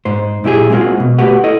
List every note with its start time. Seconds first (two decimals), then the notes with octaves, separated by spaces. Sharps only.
0.05 G#2 C5
0.44 A#2 E4 G4 G#4
0.70 G#3 A#3 C4 D#4 F4 F#4
1.00 B2
1.19 A3 F#4 G4 B4 F#5
1.44 E4 A4 D#5